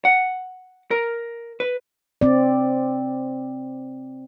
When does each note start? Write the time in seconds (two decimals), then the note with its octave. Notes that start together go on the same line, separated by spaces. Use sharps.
0.05 F#5
0.91 A#4
1.60 B4
2.21 C4 D5